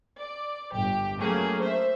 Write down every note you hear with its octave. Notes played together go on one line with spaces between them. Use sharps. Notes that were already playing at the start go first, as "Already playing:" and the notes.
D5
G1 G4
F#3 A3 A#3 C#4 G#4
C5 E5